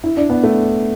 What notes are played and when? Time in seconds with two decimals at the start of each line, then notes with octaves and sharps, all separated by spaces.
0.04 E4
0.17 D4
0.30 B3
0.43 A3